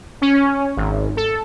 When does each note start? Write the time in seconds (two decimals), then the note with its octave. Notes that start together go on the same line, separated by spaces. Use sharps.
0.22 C#4
0.77 G#1
1.17 A4